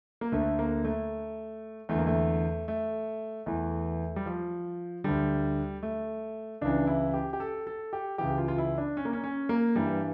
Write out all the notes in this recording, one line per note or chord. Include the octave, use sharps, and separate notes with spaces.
A#3
D2 D3 A3
A#3
A3
E2 D3 A3
A#3
A3
A3
E2 E3 A3
G3
F3
D2 D3 G3
A3
C#2 C#3 E3 D4
E4
G4
G4
A4
A4
G4
C#2 C#3 E3 G4
F4
F4
E4
D4
C#4
A#3
C#4
C#4
A#3
G2 E3 G3